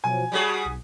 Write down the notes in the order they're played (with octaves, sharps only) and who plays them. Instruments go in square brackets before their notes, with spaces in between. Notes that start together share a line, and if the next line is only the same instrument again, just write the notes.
[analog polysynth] B2 F3 F#3 [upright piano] G#5
[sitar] G3 F#4 G#4 [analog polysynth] C#5 A5 B5
[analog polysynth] B1